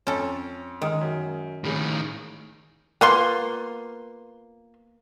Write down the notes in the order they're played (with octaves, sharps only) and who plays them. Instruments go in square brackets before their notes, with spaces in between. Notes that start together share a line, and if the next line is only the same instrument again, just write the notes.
[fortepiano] F2 [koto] C#4 A4
[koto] D#3 [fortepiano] G#3 D#6 F6
[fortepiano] F#2
[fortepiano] C#2 G#4 B5 [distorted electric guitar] A2 D#3
[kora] A#3 [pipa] B3 F4 C6